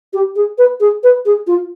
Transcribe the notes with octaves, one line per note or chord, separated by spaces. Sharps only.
G4
G#4
B4
G#4
B4
G#4
F4